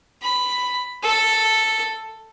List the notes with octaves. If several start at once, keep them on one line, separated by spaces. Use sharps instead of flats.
B5
A4